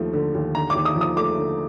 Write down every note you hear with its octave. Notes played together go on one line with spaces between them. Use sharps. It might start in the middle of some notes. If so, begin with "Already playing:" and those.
Already playing: D#2 F3 A3
D3
D#2
D3 A#5
D6
D#2
D#6
F3
D#6
A3 D6
D3